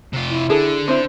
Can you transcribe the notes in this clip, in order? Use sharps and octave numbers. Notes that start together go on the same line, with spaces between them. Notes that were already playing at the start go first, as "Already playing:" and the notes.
C3 F4
E4
D3 G#4 A4
C4 E4 C5